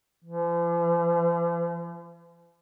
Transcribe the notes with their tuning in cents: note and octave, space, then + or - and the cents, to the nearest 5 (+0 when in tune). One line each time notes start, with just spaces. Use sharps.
F3 -45